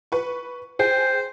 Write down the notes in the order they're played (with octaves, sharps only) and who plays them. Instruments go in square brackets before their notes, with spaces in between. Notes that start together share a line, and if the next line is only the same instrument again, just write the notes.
[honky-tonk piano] B4 C#6
[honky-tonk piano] G#4 G5 [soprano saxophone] C5